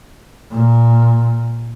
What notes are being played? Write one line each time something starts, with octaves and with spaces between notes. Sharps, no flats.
A#2